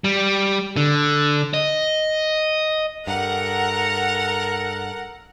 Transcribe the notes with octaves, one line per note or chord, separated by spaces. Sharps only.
G3
D3
D#5
G2 A4 A#4 F#5 A#5